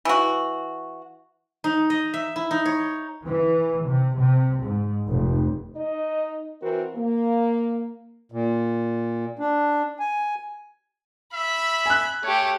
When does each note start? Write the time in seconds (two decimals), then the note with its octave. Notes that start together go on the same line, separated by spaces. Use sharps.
0.05 E3 F#4
1.64 D#4
1.90 D#5
2.14 E5
2.36 E4
2.51 D#4
2.66 C#5
3.25 E3
3.87 C3
4.17 C3
4.61 G#2
5.07 F1
5.76 D#4 D#5
6.62 E3 C4 F#4 A#4
6.96 A#3
8.32 A#2
9.39 D4
9.99 G#5
11.33 E5 B5
11.86 G#5 F#6
12.24 A3 G4 C#5